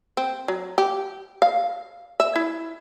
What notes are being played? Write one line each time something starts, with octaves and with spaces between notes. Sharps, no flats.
C4
F#3
G4
F5
E5
E4